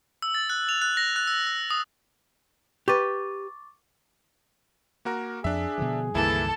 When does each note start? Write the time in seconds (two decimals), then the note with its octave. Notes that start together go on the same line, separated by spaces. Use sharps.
0.22 E6
0.35 A6
0.50 F#6
0.69 F7
0.82 F#6
0.97 A#6
1.16 F#6
1.27 E6
1.47 E6
1.71 D#6
2.88 G4 B4 C#6 D6 A6
5.05 A#3 F#4 A#4
5.44 F2 D4 G#4 E5
5.78 B2 D3 F3
6.15 C#2 G2 D#3 E3 A#3 E4 A4 A5